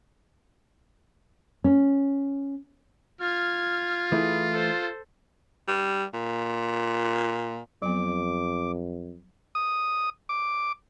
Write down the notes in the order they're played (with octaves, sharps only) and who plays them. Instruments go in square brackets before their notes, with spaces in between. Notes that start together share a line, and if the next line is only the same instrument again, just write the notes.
[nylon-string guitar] C#4
[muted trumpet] F4 [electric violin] F6 G#6
[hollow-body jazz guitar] E3 A3 E4 [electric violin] G#4
[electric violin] A4 C5
[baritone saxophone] G3
A#2
[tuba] F2 [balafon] F#3 B3 [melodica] D6
[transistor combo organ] D#6
D6